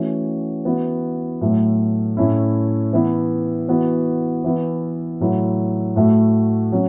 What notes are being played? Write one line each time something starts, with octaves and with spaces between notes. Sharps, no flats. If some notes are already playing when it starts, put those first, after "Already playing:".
Already playing: E3 A3 C#4 F#4
E3 B3 F#4
A2 F#3 A3
A2 A3 C#4 E4
E3 B3 E4
E3 B3 F#4
E3 B3 E4
A2 F#3 A3 E4
A2 A3 F#4
F#3 C#4